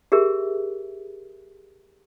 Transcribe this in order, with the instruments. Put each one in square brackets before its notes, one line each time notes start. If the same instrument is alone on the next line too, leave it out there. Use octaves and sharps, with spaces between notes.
[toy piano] G4 G#4 A#4 E5